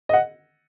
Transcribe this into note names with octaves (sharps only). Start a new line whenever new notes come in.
D#5
F#5